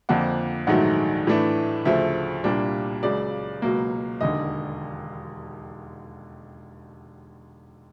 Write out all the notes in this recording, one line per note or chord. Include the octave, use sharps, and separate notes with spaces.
F2 D3 F3 A#3 D4 F#5
A#1 G#2 D#3 F#3 A3 F#5
A2 E3 A3 D4
D2 C#3 F3 A3 E5
C2 A#2 G3 A#3 D4
C#2 C#3 F#3 D5
C#2 B2 F#3 A#3
E1 D#2 D3 D#5